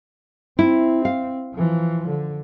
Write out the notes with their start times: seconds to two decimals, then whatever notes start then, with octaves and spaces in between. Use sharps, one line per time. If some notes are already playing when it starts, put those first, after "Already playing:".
0.59 C4 E4
1.05 F5
1.54 E3 F3
2.09 D3